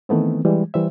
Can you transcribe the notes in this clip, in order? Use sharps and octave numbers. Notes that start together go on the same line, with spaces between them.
D#3 E3 A3 B3 C4
E3 G3 G#3
E3 G3 C5 E5